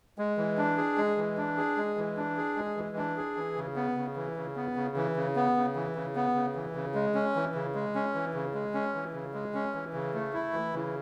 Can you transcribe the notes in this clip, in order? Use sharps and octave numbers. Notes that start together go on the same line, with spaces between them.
G#3
E3
D4
G#4
G#3
E3
D4
G#4
G#3
E3
D4
G#4
G#3
E3
D4
G#4
E3
C#3
B3
C#3
E3
C#3
B3
C#3
E3
C#3
B3
C#3
E3
C#3
B3
C#3
E3
C#3
G#3
C#4
E3
C#3
G#3
C#4
E3
C#3
G#3
C#4
E3
C#3
G#3
C#4
E3
C#3
A3
E4
E3
C#3